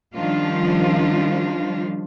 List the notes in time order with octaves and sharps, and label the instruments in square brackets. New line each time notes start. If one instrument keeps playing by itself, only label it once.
[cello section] D#3 F3 G3 C#4 D4 F4